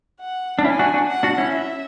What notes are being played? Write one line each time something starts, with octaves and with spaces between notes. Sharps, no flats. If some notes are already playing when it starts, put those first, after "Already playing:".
F#5
D4
C#4 E4 G#5
D4 F#4
D4 F#4
F#5
D4 F#4
C#4 E4
E5